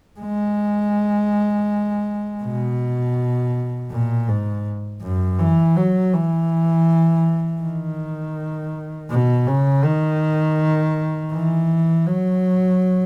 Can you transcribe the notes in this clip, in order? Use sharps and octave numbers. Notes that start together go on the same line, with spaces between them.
G#3
B2
A#2
G#2
F#2
E3
F#3
E3
D#3
B2
C#3
D#3
E3
F#3